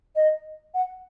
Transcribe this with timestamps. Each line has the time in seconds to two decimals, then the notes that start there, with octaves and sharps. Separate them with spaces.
0.16 D#5
0.74 F#5